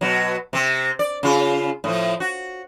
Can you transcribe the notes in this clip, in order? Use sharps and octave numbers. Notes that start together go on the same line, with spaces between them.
B2 F#3
C3 C4
D5
C#3 F4
A2 F3
F#4